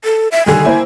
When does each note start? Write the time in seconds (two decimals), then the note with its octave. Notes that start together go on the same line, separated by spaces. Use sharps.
0.05 A4
0.32 E5
0.46 D3 D#3 G3 G#5
0.64 A#3 E4 C5